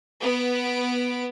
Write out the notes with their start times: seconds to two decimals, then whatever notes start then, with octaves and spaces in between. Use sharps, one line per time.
0.22 B3 B4 D7